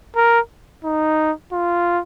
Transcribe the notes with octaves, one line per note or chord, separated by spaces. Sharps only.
A#4
D#4
F4